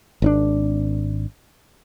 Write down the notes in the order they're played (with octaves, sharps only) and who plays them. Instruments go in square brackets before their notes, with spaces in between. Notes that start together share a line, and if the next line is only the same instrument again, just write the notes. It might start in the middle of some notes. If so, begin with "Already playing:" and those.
[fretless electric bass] G#1 C#4 D4